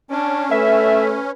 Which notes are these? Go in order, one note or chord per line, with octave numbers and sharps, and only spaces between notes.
C#4 D4
A3 B4 E5